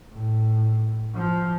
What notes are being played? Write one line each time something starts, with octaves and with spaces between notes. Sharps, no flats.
A2
F3